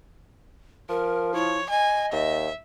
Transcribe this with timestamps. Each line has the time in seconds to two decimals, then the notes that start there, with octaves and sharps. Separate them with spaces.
0.89 F3 A#4
1.35 E4 C#5
1.70 D#5 G#5
2.12 D#2 E5